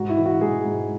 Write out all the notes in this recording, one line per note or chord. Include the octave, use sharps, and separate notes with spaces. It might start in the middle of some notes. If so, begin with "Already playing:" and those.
Already playing: G#2 F#4
E4
E3
F#4
G#2 G#4
G#2